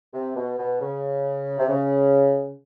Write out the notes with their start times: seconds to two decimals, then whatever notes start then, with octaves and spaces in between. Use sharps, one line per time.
0.13 C3
0.35 B2
0.58 B2
0.80 C#3
1.58 C3
1.68 C#3